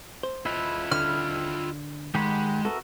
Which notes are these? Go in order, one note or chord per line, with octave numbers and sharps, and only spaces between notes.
C5
E4 F4 B4 D#5
D3 F6
D#3 G#3 G4 F#5 B5
B3 F#4 A4 A#4 E5